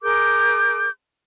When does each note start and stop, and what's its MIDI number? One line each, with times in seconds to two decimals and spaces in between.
0.03 0.88 68
0.03 0.88 70
0.03 0.88 86
0.03 0.88 91